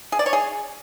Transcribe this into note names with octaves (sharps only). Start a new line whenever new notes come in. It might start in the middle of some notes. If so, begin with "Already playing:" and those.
G#4
D5
C#5
G#4